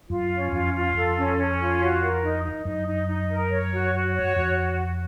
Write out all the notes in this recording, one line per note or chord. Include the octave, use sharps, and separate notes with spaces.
F#2 F4
C#4
F2 F4
F4
F2 A4
C#4
C#4
F4
F#4
A#4
D#4
D#4
F#2 D#4
D#4
D#4
A#4
C#5
F#4
F#4
C#5
F2 F#4